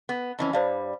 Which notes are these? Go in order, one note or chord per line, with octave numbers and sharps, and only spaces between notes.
B3
F2 E3 C#4
G2 G3 C5 D5 F5